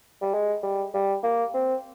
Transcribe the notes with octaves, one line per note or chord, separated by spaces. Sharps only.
G3
G#3
G3
G3
A#3
C4